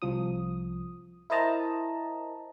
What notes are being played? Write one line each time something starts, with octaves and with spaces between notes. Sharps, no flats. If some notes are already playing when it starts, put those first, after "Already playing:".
C2 F3 D#6
E4 A#4 C5 D#5 A5 A#5